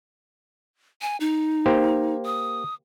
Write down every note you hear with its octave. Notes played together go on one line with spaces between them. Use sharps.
G#5
D#4
A#3 G4 C5
D#6